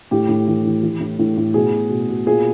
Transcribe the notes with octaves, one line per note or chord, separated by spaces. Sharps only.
A2 G4
A2
E3
E3
E3
A2
A2
A2
B2 G#4
B2
B2
B2
A#2 G#4